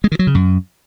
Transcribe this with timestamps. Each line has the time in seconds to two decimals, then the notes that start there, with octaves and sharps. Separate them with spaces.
0.04 G#3
0.12 D#3
0.19 F#3
0.27 C#3
0.35 F#2